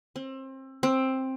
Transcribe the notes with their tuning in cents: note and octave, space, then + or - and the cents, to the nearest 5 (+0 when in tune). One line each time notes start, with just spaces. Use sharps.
C4 +30
C4 +10